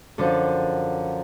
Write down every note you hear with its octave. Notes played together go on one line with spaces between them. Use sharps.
F#2 D3 F3